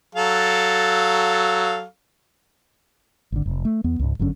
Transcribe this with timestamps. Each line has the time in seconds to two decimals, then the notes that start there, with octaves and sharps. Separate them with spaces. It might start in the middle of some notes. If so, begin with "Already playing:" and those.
0.15 F#3 A4 F5
3.32 G#1 D3
3.46 F1
3.65 A3
3.84 E2 B3
3.99 C#2 G#2
4.19 G1 F#2 D3 C#4